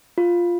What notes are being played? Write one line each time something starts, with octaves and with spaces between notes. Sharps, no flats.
F4